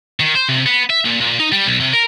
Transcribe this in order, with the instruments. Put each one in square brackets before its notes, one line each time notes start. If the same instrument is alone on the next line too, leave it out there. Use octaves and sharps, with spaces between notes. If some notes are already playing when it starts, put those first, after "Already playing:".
[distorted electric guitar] D#3
C5
C3
B3
E5
A#2
A#2
D#4
G3
B1
C3
A#4